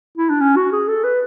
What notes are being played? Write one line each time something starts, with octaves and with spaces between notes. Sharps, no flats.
E4
D4
C#4
F#4
G#4
A4
B4